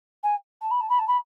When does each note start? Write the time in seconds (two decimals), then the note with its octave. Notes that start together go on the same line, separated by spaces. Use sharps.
0.23 G#5
0.61 A5
0.71 B5
0.80 A5
0.89 B5
0.99 A5
1.07 B5